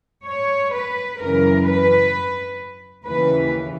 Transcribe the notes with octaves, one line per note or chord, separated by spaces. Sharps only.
C#5
B4
F#2 C#3 E3 A#4
B4
D#2 C#3 E3 B4